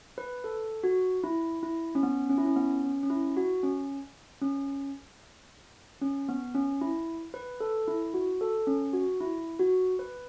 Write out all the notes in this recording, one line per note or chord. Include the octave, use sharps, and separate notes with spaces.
B4
A4
F#4
E4
E4
C#4
B3
C#4
E4
C#4
B3
C#4
C#4
E4
F#4
C#4
C#4
C#4
B3
C#4
E4
B4
A4
E4
F#4
A4
C#4
F#4
E4
F#4
B4